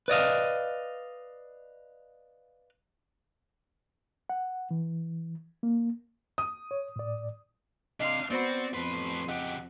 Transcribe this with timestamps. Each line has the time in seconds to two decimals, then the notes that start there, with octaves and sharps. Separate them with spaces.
0.08 B4 D5 D#5 F5
4.30 F#5
4.71 E3
5.63 A#3
6.38 D#6
6.71 C#5
6.96 A2 D5
8.00 C3 D4 D#5 F5 C6
8.31 B3 C4 F#4 C5 D5 B5
8.74 F2 A2 B4 C6
9.29 C#3 G4 D#5 F#5